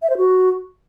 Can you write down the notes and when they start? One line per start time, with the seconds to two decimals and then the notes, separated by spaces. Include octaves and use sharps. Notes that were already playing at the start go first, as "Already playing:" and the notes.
0.02 E5
0.10 C5
0.17 F#4